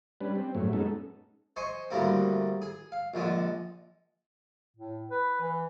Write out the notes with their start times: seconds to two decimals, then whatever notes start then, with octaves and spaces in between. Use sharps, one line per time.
0.21 G3 C#4 D4 B4
0.35 C4
0.55 F#2 A2 F#3 A3
0.73 G#3 B3 C#4 D#4 A4
1.56 C5 D#5 G#5 C6 C#6
1.91 D2 A2 D3 G3 A#3 C4
2.62 G#4
2.92 F5
3.14 A#1 D3 F3 G#3
4.77 A2
5.11 B4
5.41 E3